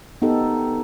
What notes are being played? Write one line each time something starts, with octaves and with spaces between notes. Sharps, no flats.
B3 D#4 G4 A4